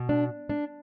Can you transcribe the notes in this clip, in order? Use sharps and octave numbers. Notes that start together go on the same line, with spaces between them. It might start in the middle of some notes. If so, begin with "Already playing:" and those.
Already playing: B2
D4
D4